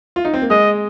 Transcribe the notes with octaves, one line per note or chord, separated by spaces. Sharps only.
F4
D#4
C4
A#3
G#3 D#5